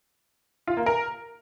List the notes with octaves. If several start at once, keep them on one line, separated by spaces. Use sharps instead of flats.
F4
A#3
A#4